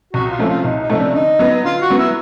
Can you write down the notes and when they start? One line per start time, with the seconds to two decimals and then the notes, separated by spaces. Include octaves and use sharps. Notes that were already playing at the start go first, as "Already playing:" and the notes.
0.13 C2 F#4
0.31 F4
0.39 C3 F3 A3 C#4 E4
0.47 F4
0.64 C2 D#4
0.81 D#4
0.89 C3 F3 A3 C#4
0.97 D4
1.14 D3 D#4
1.39 F#3 B3
1.64 D3 F4
1.81 F#4
1.90 F#3 B3
1.98 E4